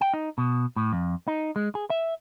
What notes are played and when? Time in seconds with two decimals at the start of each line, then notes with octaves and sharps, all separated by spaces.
0.01 G5
0.14 D#4
0.38 B2
0.76 A2
0.93 F2
1.28 D#4
1.56 G#3
1.75 G#4
1.90 E5